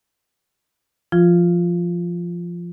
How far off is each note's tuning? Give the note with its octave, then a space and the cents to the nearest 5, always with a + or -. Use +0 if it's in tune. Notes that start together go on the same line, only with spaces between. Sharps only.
F3 -15 F4 +0